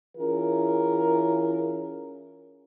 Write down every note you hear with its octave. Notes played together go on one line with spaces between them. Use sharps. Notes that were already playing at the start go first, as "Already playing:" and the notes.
E3 C#4 E4 F4 G#4 A#4